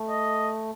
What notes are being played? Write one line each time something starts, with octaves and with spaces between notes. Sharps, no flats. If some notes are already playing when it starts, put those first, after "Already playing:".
Already playing: A3
D#5